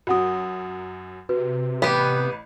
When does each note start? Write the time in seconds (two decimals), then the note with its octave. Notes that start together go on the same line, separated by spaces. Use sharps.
0.07 F#2 F#3 F#4 F#5 D#6
1.29 C3 F#4 B4
1.82 A1 B3 G4 B4 B6